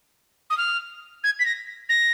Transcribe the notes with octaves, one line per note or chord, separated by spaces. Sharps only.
D#6
F6
G#6
B6
A#6
A#6